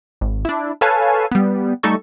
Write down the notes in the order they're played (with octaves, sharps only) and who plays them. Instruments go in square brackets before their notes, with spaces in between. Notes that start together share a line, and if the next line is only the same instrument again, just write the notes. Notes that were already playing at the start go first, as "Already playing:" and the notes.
[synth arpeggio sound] G#1
D4 E4
A4 B4 C#5 F5 G#5 A5
G3 B3
G3 A3 D#4 A4 C#6